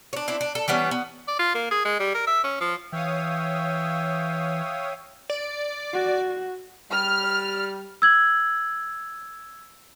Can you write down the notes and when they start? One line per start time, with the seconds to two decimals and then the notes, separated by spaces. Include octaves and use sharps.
0.13 D4 C#5
0.28 C4 D4 E4
0.41 D4
0.55 A4
0.68 E3 G3 B3 C#4
0.91 B3
1.28 D5
1.39 F4
1.55 A#3
1.71 G#4
1.85 G#3
2.00 G3
2.15 A#4
2.27 E5
2.44 C#4
2.61 F3
2.92 E3 C#5 E5 F5 G5 D#6
5.30 D5
5.94 F#4
6.91 G3 F6
8.02 E6 G#6 F#7